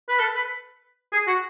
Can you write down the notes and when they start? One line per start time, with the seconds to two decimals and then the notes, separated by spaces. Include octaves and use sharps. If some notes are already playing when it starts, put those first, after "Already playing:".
0.09 B4
0.19 A4
0.35 B4
1.12 G#4
1.27 F#4